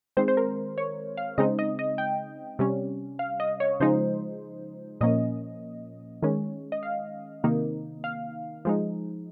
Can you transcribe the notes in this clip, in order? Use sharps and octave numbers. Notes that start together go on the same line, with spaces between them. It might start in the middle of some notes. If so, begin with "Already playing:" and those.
D#3 G#3 C4 C5
C5
A#4
C#5
F5
C#3 G#3 C4 D#4 D#5
D#5
D#5
G5
C3 G3 C#4
F5
D#5
C#5
C#3 F3 G#3 D#4 C5
A#2 F3 A#3 C#4 D#5
D#3 G#3 C#4
D#5
F5
C3 D#3 A#3 D#4
F5
F3 G#3 D#4